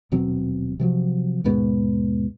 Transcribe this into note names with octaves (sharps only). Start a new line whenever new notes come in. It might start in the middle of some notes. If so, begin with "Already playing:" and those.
D#1 B2 F#3 C4
C3 F3 F#3
D#2 G#2 B2 G#3